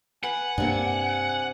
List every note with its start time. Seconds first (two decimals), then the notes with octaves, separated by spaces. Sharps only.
0.23 B4 F#5 G#5
0.58 G2 C3 A#3 D4